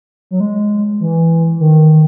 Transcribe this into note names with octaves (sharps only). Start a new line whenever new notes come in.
F#3
G#3
E3
D#3